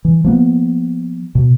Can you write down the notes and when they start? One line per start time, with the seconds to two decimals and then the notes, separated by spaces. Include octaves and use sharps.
0.05 E3
0.24 F3 A#3 B3
1.35 B2